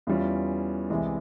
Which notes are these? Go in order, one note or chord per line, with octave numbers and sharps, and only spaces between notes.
E2 E3 G3 C#4 F4
C2 C3 E3 G#3